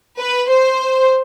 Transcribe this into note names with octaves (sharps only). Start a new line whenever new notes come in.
B4
C5